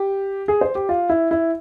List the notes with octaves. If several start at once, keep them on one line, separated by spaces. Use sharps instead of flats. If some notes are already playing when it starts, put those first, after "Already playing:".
Already playing: G4
G#4
C5
G4
F4
E4
E4